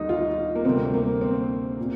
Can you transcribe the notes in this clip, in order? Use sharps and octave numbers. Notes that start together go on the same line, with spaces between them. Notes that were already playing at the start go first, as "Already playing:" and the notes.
Already playing: D2 D3 G3 D#4
F4
A#3
D2 C3 G3 C4
A#3
C4
A#2